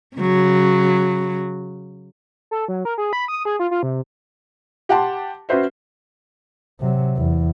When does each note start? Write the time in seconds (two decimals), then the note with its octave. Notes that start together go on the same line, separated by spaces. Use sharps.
0.17 C#3 F#3
2.51 A4
2.68 F#3
2.85 A#4
2.98 G#4
3.13 B5
3.28 D#6
3.45 G#4
3.59 F4
3.71 F4
3.83 C3
4.89 G4 F#5 G5 A5 C6
5.49 C#4 F#4 B4 C5 E5
6.80 C3 F#3
7.16 E2